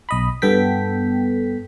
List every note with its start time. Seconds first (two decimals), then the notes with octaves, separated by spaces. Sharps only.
0.09 B1 D#5 B5
0.42 G2 B3 A4 G5 B6